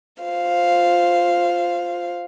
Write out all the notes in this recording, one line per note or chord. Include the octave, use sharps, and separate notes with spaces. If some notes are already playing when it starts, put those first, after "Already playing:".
F4 C5 F5